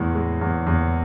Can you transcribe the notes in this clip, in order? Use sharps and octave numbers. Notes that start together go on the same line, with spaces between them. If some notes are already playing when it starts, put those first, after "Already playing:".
Already playing: E2 A2 G#3
G#3
E2
E2